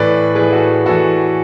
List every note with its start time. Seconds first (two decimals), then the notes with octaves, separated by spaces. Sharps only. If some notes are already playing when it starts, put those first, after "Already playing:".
Already playing: A2 E3 B4 D5
0.35 A2 E3 G#4 B4
0.52 F#4 A4
0.86 A2 E3 F#4 A4